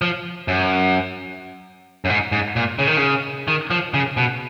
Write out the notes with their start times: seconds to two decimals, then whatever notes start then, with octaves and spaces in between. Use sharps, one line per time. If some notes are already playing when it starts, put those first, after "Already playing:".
0.02 F3
0.48 F#2
2.05 F#2
2.10 G#2
2.32 G#2
2.56 A#2
2.79 C#3
2.87 D#3
2.97 C#3
3.48 D#3
3.71 F3
3.94 C#3
4.17 B2